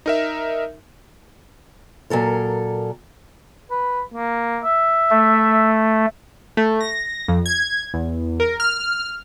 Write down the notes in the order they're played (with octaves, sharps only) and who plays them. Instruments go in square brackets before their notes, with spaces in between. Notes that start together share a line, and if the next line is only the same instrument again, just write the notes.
[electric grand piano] D#4 A#4 E5
[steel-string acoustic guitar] A#2 F#3 A4 A#4
[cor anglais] B4
A#3
E5
[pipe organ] A3
[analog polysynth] A3
A#6
F2
G#6
E2
A#4
F6